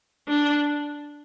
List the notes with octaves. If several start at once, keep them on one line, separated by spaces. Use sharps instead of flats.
D4